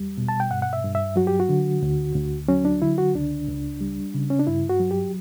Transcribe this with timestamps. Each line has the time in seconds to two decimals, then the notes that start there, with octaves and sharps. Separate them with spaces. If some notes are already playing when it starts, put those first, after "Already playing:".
Already playing: E2 G3
0.17 B2
0.28 A5
0.40 G5
0.51 G2 F#5
0.62 F#5
0.73 E5
0.84 G2
0.95 E5
1.16 F#3 F#4
1.27 G4
1.40 F#4
1.49 D3
1.82 D2
2.15 D2
2.48 F#3 C#4
2.65 D4
2.82 D3 E4
2.98 F#4
3.15 C#2 D4
3.48 C#2
3.81 G3
4.14 C#3
4.30 C#4
4.39 D4
4.47 G2 E4
4.69 F#4
4.80 F#3
4.91 G4